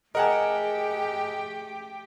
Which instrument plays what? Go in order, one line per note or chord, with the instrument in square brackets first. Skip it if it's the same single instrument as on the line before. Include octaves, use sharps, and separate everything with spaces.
[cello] A3 G4 [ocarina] G#4 [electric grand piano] A#4 F#5 A5 [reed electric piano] D#5 G#5